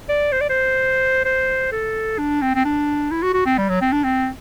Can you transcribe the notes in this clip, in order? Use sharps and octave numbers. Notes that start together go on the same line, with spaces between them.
D5
C5
D5
C5
C5
A4
D4
C4
C4
D4
E4
F#4
F#4
C4
G3
F#3
C4
D4
C4